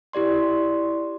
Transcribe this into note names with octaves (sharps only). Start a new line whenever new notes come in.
E4 G4 D5 C6